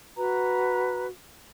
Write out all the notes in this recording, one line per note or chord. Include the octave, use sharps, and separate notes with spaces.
F#4 B4 A#5